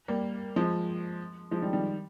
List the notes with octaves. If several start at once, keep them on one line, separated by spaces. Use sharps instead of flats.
G3 A#3
F3 G#3
F3 G#3
D#3 G3
D#3 G3